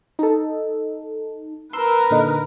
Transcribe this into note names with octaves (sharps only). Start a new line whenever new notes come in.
D#4 A4
A#4 B4 C6 E6
A#2 D3 D#4